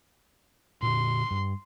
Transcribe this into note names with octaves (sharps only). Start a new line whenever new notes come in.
A#2 D3 C6
G2